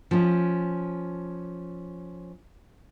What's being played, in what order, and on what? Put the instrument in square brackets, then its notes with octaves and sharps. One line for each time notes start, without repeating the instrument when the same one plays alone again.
[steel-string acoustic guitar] F3 C#4